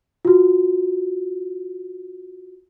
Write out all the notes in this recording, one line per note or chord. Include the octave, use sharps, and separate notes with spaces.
F4 F#4